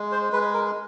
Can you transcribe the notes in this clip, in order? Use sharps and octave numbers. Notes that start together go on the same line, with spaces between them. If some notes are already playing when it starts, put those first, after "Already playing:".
Already playing: G#3
C5
G#3 B4
A#4